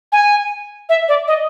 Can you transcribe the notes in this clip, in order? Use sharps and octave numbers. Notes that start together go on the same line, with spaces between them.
G#5
E5
D5
D#5